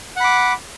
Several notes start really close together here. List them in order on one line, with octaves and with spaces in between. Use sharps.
F#5 B5 D6